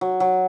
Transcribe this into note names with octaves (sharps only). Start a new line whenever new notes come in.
F#3
F#3